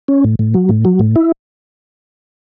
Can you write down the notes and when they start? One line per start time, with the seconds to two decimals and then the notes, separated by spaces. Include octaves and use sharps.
0.08 C#4
0.24 A2
0.39 A2
0.54 F#3
0.69 A2
0.85 F#3
0.99 A2
1.16 E4